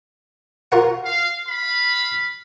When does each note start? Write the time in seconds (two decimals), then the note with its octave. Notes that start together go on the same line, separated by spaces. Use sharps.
0.72 F4 A#4 F#5
1.04 F5
1.48 F5 B5